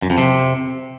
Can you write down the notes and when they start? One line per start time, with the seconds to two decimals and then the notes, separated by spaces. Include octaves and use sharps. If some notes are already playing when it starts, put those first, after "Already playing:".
0.02 F#2
0.10 F2
0.18 C3